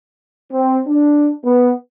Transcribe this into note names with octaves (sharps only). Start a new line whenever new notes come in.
C4
D4
B3